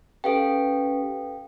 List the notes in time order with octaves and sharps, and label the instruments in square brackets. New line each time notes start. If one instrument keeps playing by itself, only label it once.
[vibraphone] C#4 G4 B4 [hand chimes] A4 F5 G5